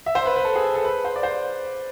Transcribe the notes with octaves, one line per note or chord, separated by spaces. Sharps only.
E5
C5
B4
B4
A4
G#4
A4
B4
C5
D5
C5